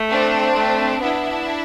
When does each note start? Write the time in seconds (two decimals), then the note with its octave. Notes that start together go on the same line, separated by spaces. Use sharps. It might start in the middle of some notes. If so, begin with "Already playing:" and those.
Already playing: A3
0.10 C4 D4
0.56 A3
1.01 B3 D4 E4